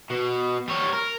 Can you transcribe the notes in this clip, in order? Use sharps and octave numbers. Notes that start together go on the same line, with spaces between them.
B2
G3 C#5
A#4